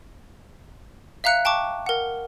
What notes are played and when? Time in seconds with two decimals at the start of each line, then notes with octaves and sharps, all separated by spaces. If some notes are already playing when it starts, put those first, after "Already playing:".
1.24 E5 F5 A#5 F#6 C#7
1.45 G5 A5 C#6 D6
1.86 A#4 F#5